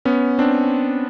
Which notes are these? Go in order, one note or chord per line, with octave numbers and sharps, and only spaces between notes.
B3 C#4
C4 D4